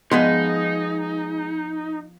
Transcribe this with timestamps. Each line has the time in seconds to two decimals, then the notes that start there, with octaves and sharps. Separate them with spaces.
0.11 F3 G#3 B3 D#4 C6